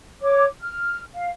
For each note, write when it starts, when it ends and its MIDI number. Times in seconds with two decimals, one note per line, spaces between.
0.21 0.45 73
0.21 0.45 86
0.61 1.00 89
1.14 1.29 77